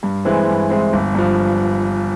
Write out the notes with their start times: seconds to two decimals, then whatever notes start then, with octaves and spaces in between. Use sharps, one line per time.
0.03 G2
0.25 E3 G#3 C4
0.48 G2
0.70 E3 G#3 C4
0.93 G1
1.15 G2 F3